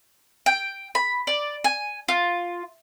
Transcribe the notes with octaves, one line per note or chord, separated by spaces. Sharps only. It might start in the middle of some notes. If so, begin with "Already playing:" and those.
G5
B5
D5
G#5
F4